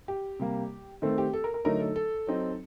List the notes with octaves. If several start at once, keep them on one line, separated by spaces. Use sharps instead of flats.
G4
C3 G3 A#3
D#3 A3 C4 A4
G4
A4
A#4
A#4
D3 F#3 A3 D#4 A#4
A4
A4
F#3 C4 D#4